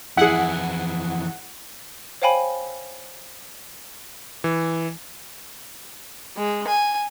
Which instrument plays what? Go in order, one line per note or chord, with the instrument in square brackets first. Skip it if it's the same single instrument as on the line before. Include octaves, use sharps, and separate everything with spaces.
[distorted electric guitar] F2 E3 [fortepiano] E4 G#4 [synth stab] F#5
[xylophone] C5 C#5 F5 G5 G#5 B5
[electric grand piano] E3
[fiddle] G#3
G#5